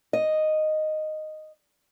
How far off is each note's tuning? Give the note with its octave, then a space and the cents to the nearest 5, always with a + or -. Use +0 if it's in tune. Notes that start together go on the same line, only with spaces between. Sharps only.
D#5 -5